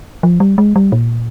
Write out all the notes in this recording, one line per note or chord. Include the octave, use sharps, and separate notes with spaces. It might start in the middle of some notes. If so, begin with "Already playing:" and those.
F3
G3
G#3
G3
A#2